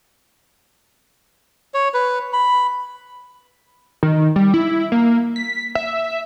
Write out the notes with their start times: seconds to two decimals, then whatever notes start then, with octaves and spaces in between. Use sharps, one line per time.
1.74 C#5
1.94 B4
2.33 B5
4.03 D#3
4.36 G3
4.54 E4
4.92 A#3
5.36 B6
5.75 E5